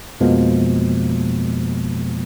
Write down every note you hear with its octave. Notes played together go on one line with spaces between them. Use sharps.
F2 B2 F3 G#3 A#3 B3